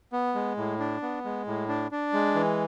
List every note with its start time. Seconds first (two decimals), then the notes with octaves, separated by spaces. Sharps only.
0.13 B3
0.35 G#3
0.57 A2
0.79 D4
1.02 B3
1.25 G#3
1.47 A2
1.68 D4
1.91 D4
2.13 G#3
2.35 E3